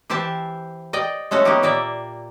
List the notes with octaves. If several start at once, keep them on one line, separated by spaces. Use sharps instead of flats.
E3 G4 C5 E5 A5
D5 D#5 G5
G#3 A3 C#4 F#4 A4
A#3 B3 C#4 D#4 G4
A#2 A#3 D5 E5